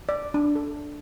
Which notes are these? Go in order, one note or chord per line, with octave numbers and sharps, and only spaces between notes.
D5
D4
A4